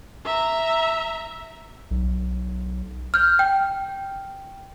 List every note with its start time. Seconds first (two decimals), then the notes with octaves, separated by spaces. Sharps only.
0.25 E5 A#5
1.91 B1
3.14 F6 G6
3.39 G5